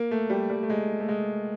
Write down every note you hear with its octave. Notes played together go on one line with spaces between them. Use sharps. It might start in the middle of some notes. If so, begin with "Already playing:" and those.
Already playing: A#3
A3
G3
G3
A3
G#3
A3
G#3